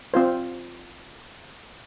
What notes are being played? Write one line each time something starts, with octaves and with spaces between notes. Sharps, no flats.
C4 F4 C5